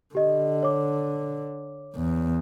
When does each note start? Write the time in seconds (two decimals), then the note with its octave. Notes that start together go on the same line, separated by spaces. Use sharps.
0.15 D3 G4 D#5
0.63 C#5 D6
1.96 E2